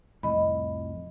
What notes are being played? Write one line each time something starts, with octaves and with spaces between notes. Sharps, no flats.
C2 F2 A2 D#5 B5